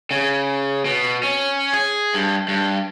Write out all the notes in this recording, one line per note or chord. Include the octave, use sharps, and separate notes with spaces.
C#3
B2
C#4
G#4
G2
G2